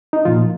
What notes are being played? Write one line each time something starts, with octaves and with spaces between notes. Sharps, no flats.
D#4
A#2 F3 F4